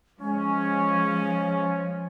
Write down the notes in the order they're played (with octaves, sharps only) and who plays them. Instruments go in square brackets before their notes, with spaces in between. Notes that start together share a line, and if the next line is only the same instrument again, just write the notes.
[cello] F3 [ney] G#3 [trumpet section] C#4